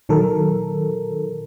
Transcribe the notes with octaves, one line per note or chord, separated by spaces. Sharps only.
A#2 D#3 F#3 A4 A#4